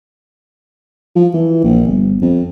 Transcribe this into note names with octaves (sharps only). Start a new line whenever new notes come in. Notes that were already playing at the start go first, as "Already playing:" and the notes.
F3
E3
A#1
G1
F2